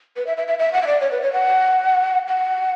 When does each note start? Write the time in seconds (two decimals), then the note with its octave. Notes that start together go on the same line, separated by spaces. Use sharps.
0.17 B4
0.27 E5
0.37 E5
0.48 E5
0.59 E5
0.73 F#5
0.82 E5
0.87 D5
1.01 C#5
1.11 B4
1.23 C#5
1.33 F#5
2.28 F#5